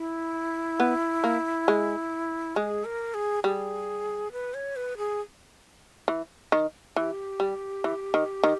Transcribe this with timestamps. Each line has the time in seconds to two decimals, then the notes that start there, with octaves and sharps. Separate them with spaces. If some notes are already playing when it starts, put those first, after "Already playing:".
Already playing: E4
0.80 B3
1.24 A#3
1.68 G#3
2.56 G#3 G#4
2.85 A#4
3.14 G#4
3.44 G3 G#4
4.32 B4
4.54 C#5
4.76 B4
4.98 G#4
6.08 E3
6.52 D#3
6.96 E3 G4
7.40 G3
7.84 E3
8.14 D#3
8.44 D#3